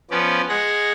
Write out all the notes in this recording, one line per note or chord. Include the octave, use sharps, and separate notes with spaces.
F3 B3 C#4 D5
G#3 G#4 F#5 A#6